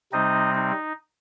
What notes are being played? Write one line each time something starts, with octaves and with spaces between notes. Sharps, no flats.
C3 G3 C4 D#4 D#5
D#4